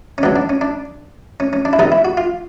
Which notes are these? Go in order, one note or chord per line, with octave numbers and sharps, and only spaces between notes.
C#4
C#2 B2 F#3 D4
D4
C#4
D4
C#4
C#4
D4
E4
C2 B2 G3 D#4
E4
F#4
F4